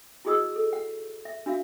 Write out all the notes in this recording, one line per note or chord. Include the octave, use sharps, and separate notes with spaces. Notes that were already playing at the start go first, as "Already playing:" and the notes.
E4 F#4 G#4 D#5 D#6 E6
A4
F#5
E5
D4 F#4 E5 F5